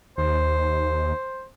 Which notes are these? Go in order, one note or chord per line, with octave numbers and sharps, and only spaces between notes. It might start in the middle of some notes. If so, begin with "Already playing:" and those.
D#2 C5